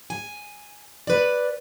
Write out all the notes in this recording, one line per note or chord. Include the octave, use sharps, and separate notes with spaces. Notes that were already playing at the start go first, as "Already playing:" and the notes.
G#5
B4 D5